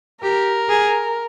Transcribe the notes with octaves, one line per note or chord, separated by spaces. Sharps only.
G4 A#4
G#4